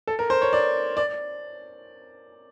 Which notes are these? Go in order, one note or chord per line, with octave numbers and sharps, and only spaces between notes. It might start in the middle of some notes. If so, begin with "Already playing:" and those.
A4
A#4
C5
C#5
D5
D5